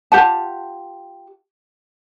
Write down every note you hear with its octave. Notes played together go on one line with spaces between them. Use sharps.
F4 G4 F#5 A5